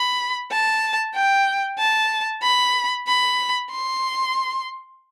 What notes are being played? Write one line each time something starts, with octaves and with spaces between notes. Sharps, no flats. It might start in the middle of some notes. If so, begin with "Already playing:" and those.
Already playing: B5
A5
G5
A5
B5
B5
C6